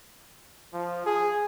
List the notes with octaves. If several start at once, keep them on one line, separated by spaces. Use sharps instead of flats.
F3
G#4